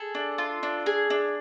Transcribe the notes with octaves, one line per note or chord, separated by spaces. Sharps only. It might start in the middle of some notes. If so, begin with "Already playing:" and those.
Already playing: G#4 A4
D4
F4
D4
G#4
D4